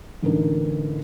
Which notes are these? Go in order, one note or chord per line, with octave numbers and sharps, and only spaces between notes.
A1 D3 D#4 A#4